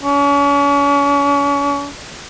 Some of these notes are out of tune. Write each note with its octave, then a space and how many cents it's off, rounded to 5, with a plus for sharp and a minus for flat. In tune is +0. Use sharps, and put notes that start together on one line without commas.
C#4 +40